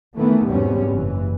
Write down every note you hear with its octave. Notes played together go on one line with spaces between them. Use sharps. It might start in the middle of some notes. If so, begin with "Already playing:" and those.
D#3 E3 A3 B3
E2 G#2 B2 G3 C4 C#4
F#1 E3